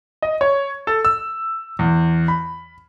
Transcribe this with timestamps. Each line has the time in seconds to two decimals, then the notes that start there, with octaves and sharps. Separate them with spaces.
0.22 D#5
0.41 C#5
0.87 A4
1.05 E6
1.79 E2
2.28 B5